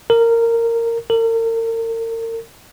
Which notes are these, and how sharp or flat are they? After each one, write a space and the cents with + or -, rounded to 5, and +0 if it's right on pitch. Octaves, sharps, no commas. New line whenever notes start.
A#4 -15
A#4 -40